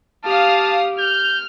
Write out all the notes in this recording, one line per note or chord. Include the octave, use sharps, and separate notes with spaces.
G4 F5 A5 D#6 F6
F6 G6